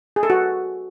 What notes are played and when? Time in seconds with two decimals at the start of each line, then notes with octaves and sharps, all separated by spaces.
0.16 G#4
0.23 A4
0.30 F#4